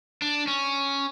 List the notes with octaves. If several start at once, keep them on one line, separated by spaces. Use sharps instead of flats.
D4
C#4